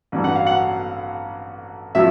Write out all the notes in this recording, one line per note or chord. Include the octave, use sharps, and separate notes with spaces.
A1 G2 E3
F#5
F5
F#5
A2 F3 E5